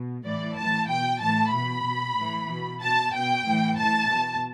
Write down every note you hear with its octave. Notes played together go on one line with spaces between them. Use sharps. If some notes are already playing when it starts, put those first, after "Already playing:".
Already playing: B2
A2 E3 D5
A2 E3 A5
B2 G5
A2 E3 A5
B2 B5
B2
A2 E3
B2
B2 A5
B2 G5
A2 E3
A2 E3 A5
B2